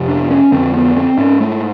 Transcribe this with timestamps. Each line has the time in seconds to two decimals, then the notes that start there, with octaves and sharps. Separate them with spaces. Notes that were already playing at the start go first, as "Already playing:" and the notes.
Already playing: F2 C3
0.09 D4
0.30 C#4
0.52 F2 D3 C4
0.74 B3
0.96 C4
1.18 G#2 C#4
1.40 A3